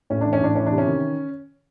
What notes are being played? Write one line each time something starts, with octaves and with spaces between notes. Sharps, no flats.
A2 C#4
E3 D4
C#4
A2 D4
E3 C#4
D4
C3
C#4
D#3